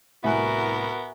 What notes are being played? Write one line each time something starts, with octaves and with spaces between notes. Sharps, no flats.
C2 A2 B3 F#4 A#4 E5 G#5 F#6